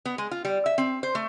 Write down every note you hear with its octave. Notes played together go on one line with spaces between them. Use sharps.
B3
G#3
F4
G3
E5
C4
C5
A3